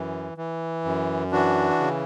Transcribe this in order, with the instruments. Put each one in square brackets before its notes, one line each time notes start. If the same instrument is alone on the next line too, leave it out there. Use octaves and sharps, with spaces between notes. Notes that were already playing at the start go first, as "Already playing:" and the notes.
Already playing: [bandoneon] F#2 E3
E3
F#2
E3 D4 F#4
C#3